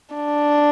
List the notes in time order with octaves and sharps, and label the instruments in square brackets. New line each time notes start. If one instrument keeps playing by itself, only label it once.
[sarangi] D4